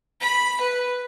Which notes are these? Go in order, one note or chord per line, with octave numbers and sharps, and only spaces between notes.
B5
B4